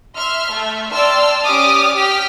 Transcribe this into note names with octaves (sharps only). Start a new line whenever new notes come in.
E5 C6 F6
A3 E5
D5 G5 A5 C6 E6 F6
C#4 G4 D5 D6 D#6 F6
G4 G5 F6 B6